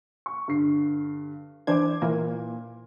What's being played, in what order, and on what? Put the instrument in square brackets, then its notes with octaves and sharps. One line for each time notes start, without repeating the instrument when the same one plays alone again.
[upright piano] C#6
G2 D3 C7
[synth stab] E3 D4 G#6 [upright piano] C5 D6
[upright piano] A#2 [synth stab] E3 A#3